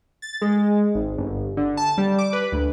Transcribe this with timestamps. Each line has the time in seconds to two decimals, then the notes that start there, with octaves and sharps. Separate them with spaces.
0.22 A6
0.42 G#3
0.95 G#1
1.18 G1
1.57 D3
1.77 A5
1.98 G3
2.18 D6
2.33 B4
2.52 D2